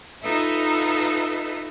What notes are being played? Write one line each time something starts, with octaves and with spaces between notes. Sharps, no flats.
D#4 F4 A4 B4 D#5 E5